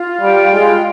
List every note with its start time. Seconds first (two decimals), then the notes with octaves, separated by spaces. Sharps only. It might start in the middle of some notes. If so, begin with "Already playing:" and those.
Already playing: F4
0.21 G3 G5
0.53 G#3 F4